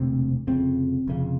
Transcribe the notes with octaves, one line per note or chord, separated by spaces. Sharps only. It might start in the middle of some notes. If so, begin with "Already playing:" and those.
Already playing: E1 D2 C3 C4
F1 F2 C#3 C4
F1 F2 C#3